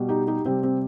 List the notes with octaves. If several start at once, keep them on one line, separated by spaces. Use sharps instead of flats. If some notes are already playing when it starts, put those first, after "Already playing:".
Already playing: B2 G3
D#4 G4
D#4 G4
C3 G3 C4
C4